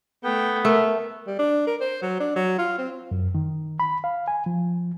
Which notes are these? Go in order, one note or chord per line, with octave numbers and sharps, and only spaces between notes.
A3 B3 G5
A3 A#4
G3
D4
A#4
C5
F#3
D4
F#3
F4
C4
F#2
D#3
B5
F5
G#5
F3